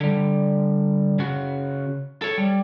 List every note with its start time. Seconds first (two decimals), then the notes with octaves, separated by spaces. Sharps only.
0.01 D3 G3
1.19 C#3 F#4
2.22 A4 C#5
2.38 G3